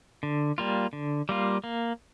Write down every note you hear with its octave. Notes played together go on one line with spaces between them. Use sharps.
D3
G3 A#3 F4
D3
G3 A#3 F4
A#3